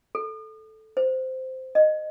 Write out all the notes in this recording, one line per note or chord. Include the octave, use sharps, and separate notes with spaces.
A4
C5
D#5